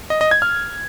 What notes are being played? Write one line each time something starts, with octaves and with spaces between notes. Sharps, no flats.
D#5
D#5
G#6
F6